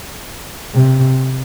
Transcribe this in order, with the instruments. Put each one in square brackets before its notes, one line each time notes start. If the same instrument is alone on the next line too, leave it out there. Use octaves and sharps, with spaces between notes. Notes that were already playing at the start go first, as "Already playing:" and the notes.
[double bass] C3